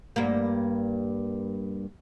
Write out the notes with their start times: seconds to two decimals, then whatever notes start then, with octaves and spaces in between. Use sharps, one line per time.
0.16 G2 A#3